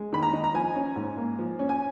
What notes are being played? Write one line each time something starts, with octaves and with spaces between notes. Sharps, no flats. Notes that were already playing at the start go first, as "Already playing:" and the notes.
Already playing: G#3
D#3 B5
A#5
D#4
A#5
F3 G#5
C#4
G#2
A#3
F3
C#4
G#5